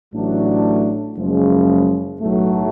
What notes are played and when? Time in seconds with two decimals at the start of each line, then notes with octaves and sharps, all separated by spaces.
0.13 A1 A2 F#3 A3 D4
1.16 F#1 F#2 C#3 F3 G#3
2.20 B1 A2 F#3 A3